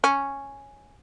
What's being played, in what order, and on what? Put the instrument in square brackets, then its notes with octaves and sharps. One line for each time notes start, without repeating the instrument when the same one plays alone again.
[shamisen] C#4